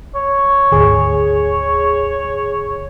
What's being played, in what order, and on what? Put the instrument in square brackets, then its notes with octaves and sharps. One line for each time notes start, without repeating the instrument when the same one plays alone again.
[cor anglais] C#5
[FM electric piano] G#1 D2 G#4